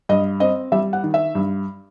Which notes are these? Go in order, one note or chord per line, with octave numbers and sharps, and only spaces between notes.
G2 D#5
C4 D#5
G3 E5
F#5
D#3
E5
G2